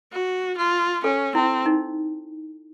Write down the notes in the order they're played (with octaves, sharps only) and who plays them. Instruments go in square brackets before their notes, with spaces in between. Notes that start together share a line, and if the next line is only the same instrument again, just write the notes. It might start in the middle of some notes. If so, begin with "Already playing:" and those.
[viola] F#4
F4
[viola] C#4 [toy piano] A4
[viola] C4 [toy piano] E4
[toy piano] D#4